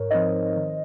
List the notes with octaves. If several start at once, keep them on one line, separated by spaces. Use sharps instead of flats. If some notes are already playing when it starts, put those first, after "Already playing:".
Already playing: G#2 A#4 C#5
F3 C4 D#4 C5 D#5
D#3